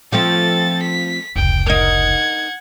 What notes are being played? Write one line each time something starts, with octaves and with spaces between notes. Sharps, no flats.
F3 A3 C4 A4 A6
B6
F1 C#2 G5
D#4 A#4 F#5 G#6